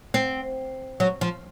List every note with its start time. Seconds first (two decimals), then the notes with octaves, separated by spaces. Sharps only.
0.14 C4
1.00 F#3
1.21 F3